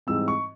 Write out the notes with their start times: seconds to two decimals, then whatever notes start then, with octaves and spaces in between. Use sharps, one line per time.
0.07 G#2 E3 G3 C4 E6
0.28 C#6